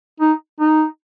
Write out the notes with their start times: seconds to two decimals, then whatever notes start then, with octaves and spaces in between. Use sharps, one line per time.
0.20 D#4
0.60 D#4